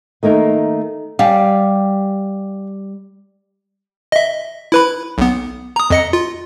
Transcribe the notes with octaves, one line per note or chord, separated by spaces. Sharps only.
D#3 A3 A#3 A#4
G3 F5 G5 G#5
D#5 E5
E4 B4 B5
B1 B3
A#5 D#6
F2 D#5 C#7
F4